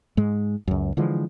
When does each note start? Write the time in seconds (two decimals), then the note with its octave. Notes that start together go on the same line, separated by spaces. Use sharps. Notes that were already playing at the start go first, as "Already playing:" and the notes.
0.17 G#2 G#3
0.68 C#2 F#2
0.97 D3 E3 F3 G#3